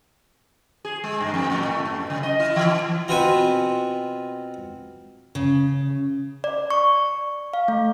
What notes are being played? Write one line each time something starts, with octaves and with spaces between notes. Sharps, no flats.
G#4
G#3
G2
F2
A2
A3
F#2
C#3
D#5
E4
E3
B2 C4 F4 B4 C5 G#5
C#3
D5
C#6
F5
A3